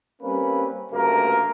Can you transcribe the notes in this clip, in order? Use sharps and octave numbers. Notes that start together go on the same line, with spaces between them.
G3 A#3 C4 C#4 B4
D2 G2 C#3 A3 A#3 A#4